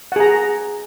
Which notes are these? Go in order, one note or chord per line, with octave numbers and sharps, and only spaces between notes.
G#4 F#5 A#5